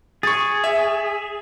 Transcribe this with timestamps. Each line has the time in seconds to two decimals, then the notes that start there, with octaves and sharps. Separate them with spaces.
0.23 G#4 C#6 A6
0.64 E5